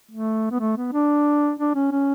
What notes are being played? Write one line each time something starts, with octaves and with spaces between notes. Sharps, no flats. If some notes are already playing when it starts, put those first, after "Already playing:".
A3
B3
A3
B3
D4
D4
C#4
C#4